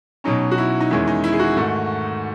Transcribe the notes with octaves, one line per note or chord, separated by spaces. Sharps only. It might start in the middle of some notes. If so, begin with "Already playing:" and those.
B2 F#3 C#4 D#4
F#4
E4
D#4
E2 D#3 G#3 C#4 E4
D#4
E4
G#4
D#4 F#4
G#2 D#3 A3